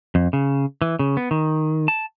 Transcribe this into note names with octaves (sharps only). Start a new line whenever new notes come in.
F2
C#3
E3
C#3
B3
D#3
A5